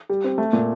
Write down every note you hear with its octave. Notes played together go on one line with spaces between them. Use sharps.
G3
C4
A3
A#2